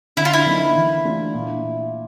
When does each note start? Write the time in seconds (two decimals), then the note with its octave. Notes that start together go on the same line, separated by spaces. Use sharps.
0.17 D3 E4
0.25 F4
0.33 E4
0.46 F3 A#3 D#4
0.76 E3
1.05 A3 D4 F4
1.34 A#2